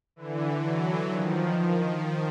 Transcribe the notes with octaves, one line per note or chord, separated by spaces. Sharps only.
D3 E3
E3 F#3
D#3 F3